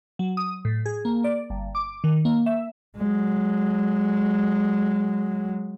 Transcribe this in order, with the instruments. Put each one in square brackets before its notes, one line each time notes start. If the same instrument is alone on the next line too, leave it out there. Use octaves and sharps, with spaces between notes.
[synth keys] F#3
D#6
A2
G#4
A#3
D5
G1
D6
D#3
A#3
E5
[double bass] F#3 G#3